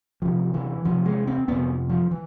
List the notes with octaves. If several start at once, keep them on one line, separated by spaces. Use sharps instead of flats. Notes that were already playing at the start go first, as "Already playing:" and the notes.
E2 C3 F3
E3
E2 C3 F3
G#3
C4
F2 C3 B3
F3
E3